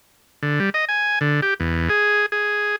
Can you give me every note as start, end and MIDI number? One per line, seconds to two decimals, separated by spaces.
0.43 0.60 50
0.60 0.70 55
0.74 0.85 75
0.89 1.19 80
1.21 1.41 50
1.42 1.54 67
1.60 1.89 40
1.89 2.26 68
2.32 2.76 68